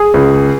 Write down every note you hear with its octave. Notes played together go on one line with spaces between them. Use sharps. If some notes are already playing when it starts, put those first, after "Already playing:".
Already playing: G#4
C#2